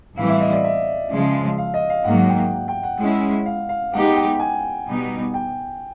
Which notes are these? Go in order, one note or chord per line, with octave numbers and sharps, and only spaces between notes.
A2 E3 G3 C4 E4 F5
E5
D#5
D5
E5
C#3 F3 G#3
F5
D#5
F5
G#2 D#3 F#3 A#3 F#5
F#5
G5
G5
F#5
G#3 C#4 E4
F5
F5
G#3 B3 D#4 G4 F#5
G5
G#5
B2 G3 B3 D#4
G5